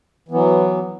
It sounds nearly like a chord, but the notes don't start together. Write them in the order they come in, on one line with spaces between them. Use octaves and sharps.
E3 B3 F#3